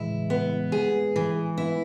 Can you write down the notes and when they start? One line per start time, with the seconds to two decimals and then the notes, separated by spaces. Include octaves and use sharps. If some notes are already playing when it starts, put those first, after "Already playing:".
Already playing: A2 C#3 E3 G#3 E4
0.30 B3
0.72 G#4
1.16 E3
1.58 B3 E4